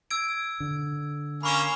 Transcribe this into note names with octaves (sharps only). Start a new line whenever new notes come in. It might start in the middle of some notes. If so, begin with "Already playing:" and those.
E6 G#6 D7
D3
A#3 C#4 B5 C#6 E7